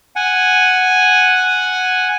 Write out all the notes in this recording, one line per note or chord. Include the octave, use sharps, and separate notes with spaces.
F#5 G#5